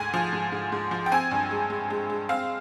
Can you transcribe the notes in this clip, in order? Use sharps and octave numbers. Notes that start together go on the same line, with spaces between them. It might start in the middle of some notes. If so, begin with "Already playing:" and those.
Already playing: D2 G#2 G#5
F3
G#2
G#2
G#2
F3
G5
C4 G#5
G2
G#3
G#3
G#3
G#3
C4 F5